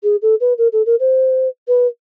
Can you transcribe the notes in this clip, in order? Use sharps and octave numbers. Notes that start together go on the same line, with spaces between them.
G#4
A4
B4
A#4
A4
A#4
C5
B4